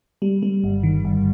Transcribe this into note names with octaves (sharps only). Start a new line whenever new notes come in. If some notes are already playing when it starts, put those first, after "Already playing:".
G3
G3
G1
D#3
G1